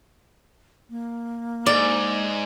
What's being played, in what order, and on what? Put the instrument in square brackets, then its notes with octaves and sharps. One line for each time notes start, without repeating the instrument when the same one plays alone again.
[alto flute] A#3
[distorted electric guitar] G#2 [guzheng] D5